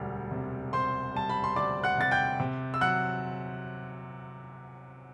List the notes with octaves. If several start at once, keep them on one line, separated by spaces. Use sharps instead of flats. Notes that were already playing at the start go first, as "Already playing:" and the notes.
Already playing: E1 D2 G3
C3
C3 C5 C6
G3 A5
B5
C6
D2 D5 D6
F#5 F#6
C3 A6
G5 G6
C3
E6
F#3 F#5 F#6